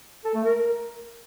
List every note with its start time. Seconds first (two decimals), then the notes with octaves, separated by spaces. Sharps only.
0.25 A4
0.35 A3
0.44 A#4